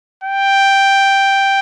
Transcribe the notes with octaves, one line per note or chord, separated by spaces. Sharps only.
G5